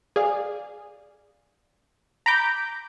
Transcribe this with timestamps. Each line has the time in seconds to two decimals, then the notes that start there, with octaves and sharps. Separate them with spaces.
0.16 G#4 D5 F5
2.26 A#5 B5 D6 G6